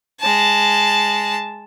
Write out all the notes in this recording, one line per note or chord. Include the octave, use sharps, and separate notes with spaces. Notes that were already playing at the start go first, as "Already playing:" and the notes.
G#3 A5